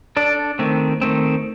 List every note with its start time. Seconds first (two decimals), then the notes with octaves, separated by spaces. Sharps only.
0.17 D4 A4 D5
0.59 D#3 A3 C4
1.02 D#3 A3 C4